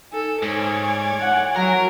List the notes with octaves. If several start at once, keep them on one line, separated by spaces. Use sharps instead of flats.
D#4 A4 G#5
G#2 C#5 D5
F#5
F#3 A#4